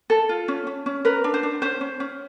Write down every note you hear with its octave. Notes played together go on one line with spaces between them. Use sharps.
A4
F4
C#4
C#4
C#4
A#4 B4
D4
C5
D4
C#4 C5
C#4
C#4